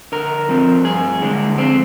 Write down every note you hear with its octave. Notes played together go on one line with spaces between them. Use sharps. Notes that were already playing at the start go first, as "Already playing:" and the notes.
D3 A#4
F3 C4
G2 G#4
D3 G#3
F2 C4